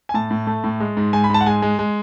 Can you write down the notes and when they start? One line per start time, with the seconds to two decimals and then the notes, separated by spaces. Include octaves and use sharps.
0.09 G#5
0.14 A2 A5
0.31 A2
0.47 A3
0.64 A2
0.80 G#3
0.97 G#2
1.13 G#2 G#5
1.24 B5
1.30 G#2 A5
1.41 F#5
1.46 G#3 G#5
1.62 G#3
1.79 G#3